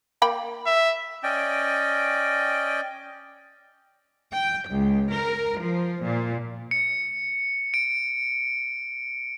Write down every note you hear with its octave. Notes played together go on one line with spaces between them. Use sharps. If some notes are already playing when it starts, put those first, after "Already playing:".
A#3 G5 B5
E5
C#4 D5 D#5 G5
G5
C#2
A#4
F3
A#2
C#7
D7